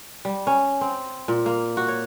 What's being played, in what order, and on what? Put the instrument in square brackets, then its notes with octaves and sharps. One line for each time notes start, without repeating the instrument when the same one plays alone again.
[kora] G3
C#4
C4
A#2
A#3
F#4
C#5